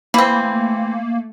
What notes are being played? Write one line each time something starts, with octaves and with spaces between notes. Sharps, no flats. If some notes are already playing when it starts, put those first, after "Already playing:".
E3 A3 A#3 C4 B5